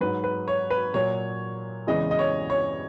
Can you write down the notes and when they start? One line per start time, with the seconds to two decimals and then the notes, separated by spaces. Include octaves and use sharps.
0.01 G#2 F#3 B4
0.24 B4
0.48 C#5
0.70 B4
0.94 A#2 F#3 C#5
1.87 E2 C#3 E3 G#3 D#5
2.11 D#5
2.19 C#5
2.50 C#5